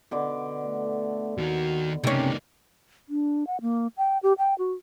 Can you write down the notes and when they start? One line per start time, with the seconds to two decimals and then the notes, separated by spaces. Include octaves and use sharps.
0.11 B2 D3 D6
0.66 A3
1.38 D#2 D#3 F#4
2.04 C#2 C3 A#3 C#4 D#4
3.09 D4
3.47 F#5
3.61 A#3
3.97 G5
4.23 G4
4.38 G5
4.59 F#4